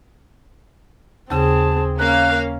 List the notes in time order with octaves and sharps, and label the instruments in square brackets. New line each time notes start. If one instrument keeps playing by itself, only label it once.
[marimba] D#2 C#3 [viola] C4 G#4 [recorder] A5
[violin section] A#3 F5 [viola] C#4 [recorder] F#6